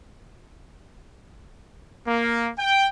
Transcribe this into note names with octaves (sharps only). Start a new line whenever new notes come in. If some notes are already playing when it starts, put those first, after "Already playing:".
A#3
G5